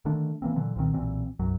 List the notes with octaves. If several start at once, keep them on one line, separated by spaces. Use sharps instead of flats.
D3 D#3 A3 D4
E3 A#3 C4
A#2 D3 E3 F#3
C2 A#2 D#3 C4
B1 A#2 E3 C4
B1 F#2 F#3